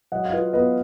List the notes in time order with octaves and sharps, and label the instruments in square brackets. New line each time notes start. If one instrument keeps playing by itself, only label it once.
[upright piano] F#3 D#5 F#5
F5
F4 B4 D#5
B3 B4 D#5